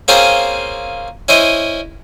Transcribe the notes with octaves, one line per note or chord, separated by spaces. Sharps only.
A#3 C4 C#4 F4 G#4 C5
C#4 E4 C5 D#5